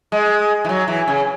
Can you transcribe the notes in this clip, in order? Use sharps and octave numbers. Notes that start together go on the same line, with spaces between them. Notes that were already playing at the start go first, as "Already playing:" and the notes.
G#3
E3
F#3
E3
C#3